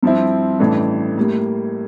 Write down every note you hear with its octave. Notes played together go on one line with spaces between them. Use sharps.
G2 F3 C4 E4
A1 G2 E3 A3 D4
A2 G3 A#3